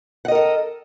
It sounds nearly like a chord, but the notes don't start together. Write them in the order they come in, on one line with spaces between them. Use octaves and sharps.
F#5 D#5 A#4 A4